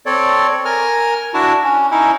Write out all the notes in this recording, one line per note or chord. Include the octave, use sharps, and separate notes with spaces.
C4 A4 C#5 D5
A#4 G#5 F6
D4 E4 F#4 A5
C#4
C#4 D#4 E4